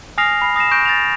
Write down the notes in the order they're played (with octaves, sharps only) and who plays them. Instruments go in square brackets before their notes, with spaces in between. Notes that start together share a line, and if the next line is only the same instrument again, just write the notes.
[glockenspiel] G#5 D#6 F6 A#6 C7 F7
B5 C7
D#6 A#6 C7 E7
C#6 G6 A#6 D7
A6 A#6 F7